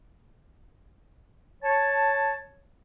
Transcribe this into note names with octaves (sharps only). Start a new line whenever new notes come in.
C#5 A5